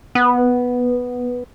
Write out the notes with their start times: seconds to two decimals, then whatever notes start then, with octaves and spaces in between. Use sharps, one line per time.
0.15 B3